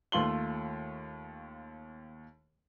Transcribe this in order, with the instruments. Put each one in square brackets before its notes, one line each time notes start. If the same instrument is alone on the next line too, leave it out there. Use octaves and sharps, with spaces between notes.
[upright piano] D#2 A3 F4 C6 F#7 G7